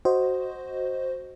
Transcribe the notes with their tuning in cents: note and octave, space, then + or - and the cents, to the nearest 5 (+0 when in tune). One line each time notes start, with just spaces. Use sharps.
F#4 +5 C5 +0 D#5 +5